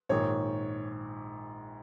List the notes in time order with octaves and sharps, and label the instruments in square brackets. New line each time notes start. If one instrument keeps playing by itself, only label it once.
[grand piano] A#1 G#2 D#3 [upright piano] C#5